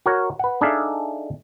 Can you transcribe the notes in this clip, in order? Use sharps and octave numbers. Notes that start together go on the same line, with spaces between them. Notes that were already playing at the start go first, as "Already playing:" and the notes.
F#4 A#4 C#5
B4 F#5
D4 D#4 G#4 A4 E5 F5